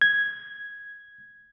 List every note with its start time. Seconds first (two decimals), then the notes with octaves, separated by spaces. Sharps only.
0.01 G#6